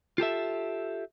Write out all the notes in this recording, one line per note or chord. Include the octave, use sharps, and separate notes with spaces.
F4 G4 A4 E5